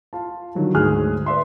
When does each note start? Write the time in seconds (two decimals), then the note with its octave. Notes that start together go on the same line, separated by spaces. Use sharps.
0.13 F4 A5
0.55 D3 D#3 F#3 G3
0.74 D2 G#2 G#4 G#5 F6 F#6
1.26 B4 D5 E5 C6